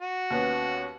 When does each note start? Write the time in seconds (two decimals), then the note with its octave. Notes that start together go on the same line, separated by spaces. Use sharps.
0.01 F#4
0.30 D#2 B3 C#4